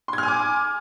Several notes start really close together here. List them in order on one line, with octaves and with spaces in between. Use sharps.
C6 G#6 F6 G#5 D6